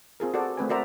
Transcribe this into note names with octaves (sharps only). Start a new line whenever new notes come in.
C4 F4 G#4 A#4
F#4 A4 C5 D5
A3 C4 B4 G#5
F#4 A#4 C5 D5 E5 A#5